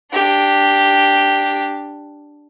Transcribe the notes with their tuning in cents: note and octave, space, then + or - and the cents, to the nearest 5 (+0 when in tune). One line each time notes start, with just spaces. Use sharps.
D4 +0 G4 +0